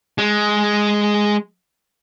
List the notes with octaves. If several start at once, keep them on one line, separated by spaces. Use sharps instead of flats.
G#3